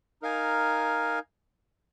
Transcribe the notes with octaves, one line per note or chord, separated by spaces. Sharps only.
D#4 A#4 F5 G#5